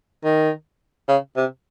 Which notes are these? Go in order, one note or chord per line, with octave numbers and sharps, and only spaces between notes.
D#3
C#3
C3